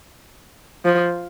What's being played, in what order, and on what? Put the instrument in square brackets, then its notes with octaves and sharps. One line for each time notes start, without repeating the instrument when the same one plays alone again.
[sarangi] F3